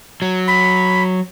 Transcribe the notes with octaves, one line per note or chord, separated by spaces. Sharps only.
F#3
B5